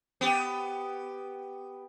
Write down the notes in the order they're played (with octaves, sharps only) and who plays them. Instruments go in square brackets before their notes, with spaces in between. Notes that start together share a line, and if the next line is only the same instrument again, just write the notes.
[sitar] B3 G4